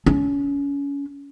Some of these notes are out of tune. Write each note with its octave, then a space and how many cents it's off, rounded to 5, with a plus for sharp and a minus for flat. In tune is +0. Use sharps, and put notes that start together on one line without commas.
C#4 +25